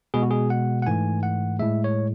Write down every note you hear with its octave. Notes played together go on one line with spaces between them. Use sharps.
B2 G#3 G#4
F#4
G#4
F#5
F#5
G#2 E3 A3 G#5
F#5
A2 G#3 E5
C#5